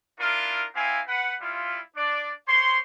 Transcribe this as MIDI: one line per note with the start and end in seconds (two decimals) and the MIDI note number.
0.19 0.65 62
0.19 0.65 64
0.19 0.65 65
0.19 0.65 70
0.75 1.00 60
0.75 1.00 64
0.75 1.00 67
0.75 1.00 77
0.75 1.00 80
1.08 1.35 71
1.08 1.35 78
1.40 1.79 55
1.40 1.79 64
1.40 1.79 65
1.96 2.32 62
1.96 2.32 74
2.48 2.78 72
2.48 2.78 73
2.48 2.78 84